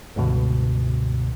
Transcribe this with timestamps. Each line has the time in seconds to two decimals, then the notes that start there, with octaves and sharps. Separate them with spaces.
0.16 C#2 G2 B2 D3